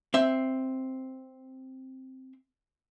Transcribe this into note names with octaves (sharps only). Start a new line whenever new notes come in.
C4 E5